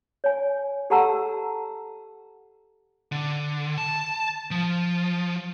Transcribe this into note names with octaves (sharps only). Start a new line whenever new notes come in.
C#5 G#5
G4 A4 F#5 A5 A#5 E6
D3
A5
F3